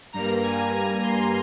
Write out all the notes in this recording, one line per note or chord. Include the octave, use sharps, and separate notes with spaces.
G2 G3 A#3 A#5
G#5
A#5
C6